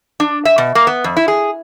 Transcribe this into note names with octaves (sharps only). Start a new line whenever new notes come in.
D4
E5
B2
A#3
B3
F2
E4
G#4